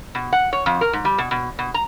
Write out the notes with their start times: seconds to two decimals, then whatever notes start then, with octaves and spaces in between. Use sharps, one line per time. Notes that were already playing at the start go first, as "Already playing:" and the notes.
0.15 B2
0.33 F#5
0.53 C#5
0.66 F2
0.81 A#4
0.93 G#2
1.05 G3
1.18 B2
1.31 B2
1.59 B2
1.74 A#5